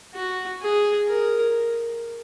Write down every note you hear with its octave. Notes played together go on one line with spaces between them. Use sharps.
F#4
G#4
A#4